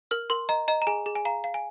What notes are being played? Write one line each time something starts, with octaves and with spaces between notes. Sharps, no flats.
A#4 F6
A#4 C6
D#5 A#5
D#5 A#5
A#5
G#4 G#5
G#4
G#5
F5 A#5
F5
G#5